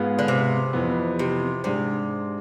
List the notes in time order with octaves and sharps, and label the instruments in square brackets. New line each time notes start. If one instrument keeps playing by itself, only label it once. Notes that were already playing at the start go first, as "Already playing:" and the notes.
Already playing: [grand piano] G#2 G#3 B3 F4
[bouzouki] D3
C3
[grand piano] F2 E3 B3
[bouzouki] C3
[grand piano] G#2 G#3 D4 [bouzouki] C3